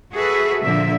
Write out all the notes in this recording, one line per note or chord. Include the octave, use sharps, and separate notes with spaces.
F#4 G#4 A4 B4 E5
A#2 D3 F3 A#3 E5